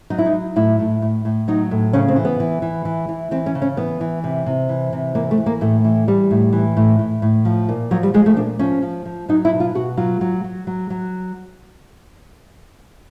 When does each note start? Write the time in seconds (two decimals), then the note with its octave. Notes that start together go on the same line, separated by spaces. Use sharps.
0.10 F#3 D#4
0.18 E4
0.26 D#4
0.33 F#3
0.56 A2 E4
0.79 A2
1.02 A2
1.25 A2
1.48 F#3 D#4
1.71 A2
1.93 C#3 C#4
2.08 C4
2.16 E3
2.25 B3
2.40 E3
2.62 E3
2.85 E3
3.09 E3
3.31 E3 C4
3.46 C#4
3.55 C#3
3.62 C#4
3.77 E3 B3
4.01 E3
4.24 C3
4.46 C3
4.69 E3
4.93 C3
5.15 E3 A#3
5.31 A3
5.38 E3
5.46 A#3
5.61 A2 A3
5.85 E3
6.08 E3 G3
6.31 A2
6.53 E3
6.77 A2
6.99 A2
7.22 A2
7.45 F3
7.69 A#2
7.91 F3 F#3
8.03 G3
8.14 F3 G#3
8.26 A3
8.36 A#2 D4
8.59 F3 C#4
8.82 F3
9.05 F3
9.29 F#3 D#4
9.45 E4
9.52 B2
9.60 F4
9.75 B2 F#4
9.97 F#3 F4
10.21 F#3
10.44 F#3
10.67 F#3
10.90 F#3